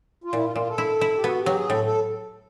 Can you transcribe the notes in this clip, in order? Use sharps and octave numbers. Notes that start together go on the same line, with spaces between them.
F4
A#2 E4
F4
A#2 F4
A4
E4
E4
G4
B3 F#4
G4
F#3
G#4
A2 A4
A4